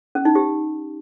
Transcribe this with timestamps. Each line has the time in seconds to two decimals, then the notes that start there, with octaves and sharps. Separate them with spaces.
0.15 C#4
0.25 D#4
0.35 G4